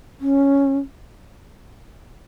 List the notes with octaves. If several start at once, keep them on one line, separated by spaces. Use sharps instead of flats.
C#4